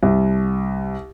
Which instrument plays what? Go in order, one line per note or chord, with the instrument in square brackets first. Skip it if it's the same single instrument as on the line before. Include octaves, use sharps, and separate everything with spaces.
[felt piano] C2